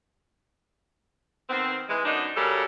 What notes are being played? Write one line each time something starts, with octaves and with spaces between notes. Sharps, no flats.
D#3 B3 C4
E3 G#3
F#2 B3 D4 D#4
C#3 F#3 G3 A4 A#4